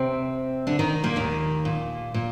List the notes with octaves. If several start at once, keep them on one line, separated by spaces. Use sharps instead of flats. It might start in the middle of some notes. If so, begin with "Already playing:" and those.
Already playing: C3 C4
D3 D4
D#3 D#4
A#2 A#3
D#2 D#3
A#2
A#2